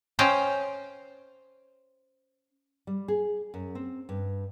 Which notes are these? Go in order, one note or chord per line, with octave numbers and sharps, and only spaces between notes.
C#4 C5 D#5 F5 G5
G3
G#4
F#2
C4
G2